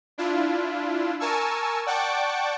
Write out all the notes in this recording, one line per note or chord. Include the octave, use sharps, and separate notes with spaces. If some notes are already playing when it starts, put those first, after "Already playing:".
D4 E4 F4
A#4 G#5 A5 C#6 E6
D5 F#5 G5 A5 C#6 D6